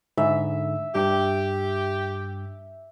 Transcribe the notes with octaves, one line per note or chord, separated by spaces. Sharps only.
G#2 D3 E5
G2 G4